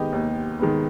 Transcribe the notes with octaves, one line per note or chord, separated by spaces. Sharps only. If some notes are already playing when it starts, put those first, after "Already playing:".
Already playing: D#3 G#3 B3 D#4 G4
D#2
D#3 G#3 B3